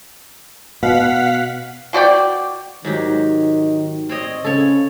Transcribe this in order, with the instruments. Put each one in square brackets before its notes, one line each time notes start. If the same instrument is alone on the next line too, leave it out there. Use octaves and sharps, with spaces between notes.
[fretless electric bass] B2 [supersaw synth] F5 F#5 B6
[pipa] B2 F#4 D5 G5
[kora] G#2 F#3 G4 [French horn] D#3
[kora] C4 C#5 D#5
[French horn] C#3 [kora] A4 C#5